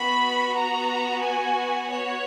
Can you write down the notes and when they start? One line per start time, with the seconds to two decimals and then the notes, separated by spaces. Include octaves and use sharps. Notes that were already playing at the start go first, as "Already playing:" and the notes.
Already playing: B3 F#4 B5
0.55 A#5
1.22 G#5
1.89 C#5